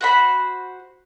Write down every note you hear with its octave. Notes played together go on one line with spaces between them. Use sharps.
F#4 C5 B5